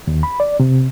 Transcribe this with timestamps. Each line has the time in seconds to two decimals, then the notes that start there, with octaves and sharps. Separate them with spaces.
0.07 D#2
0.23 B5
0.40 D5
0.60 C3